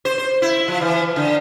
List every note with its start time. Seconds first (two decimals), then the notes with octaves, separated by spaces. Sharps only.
0.05 C5
0.18 C5
0.42 E4
0.68 F3
0.81 E3
1.16 D3